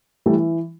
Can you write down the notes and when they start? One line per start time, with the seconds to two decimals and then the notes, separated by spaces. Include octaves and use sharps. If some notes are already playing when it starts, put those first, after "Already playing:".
0.26 E3 G3 A3